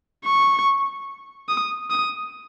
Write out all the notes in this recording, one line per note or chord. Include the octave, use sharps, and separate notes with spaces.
C#6
D#6
D#6